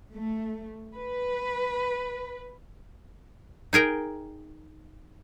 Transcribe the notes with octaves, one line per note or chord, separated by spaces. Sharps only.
A3
B4
D#4 G#4 A#4 G5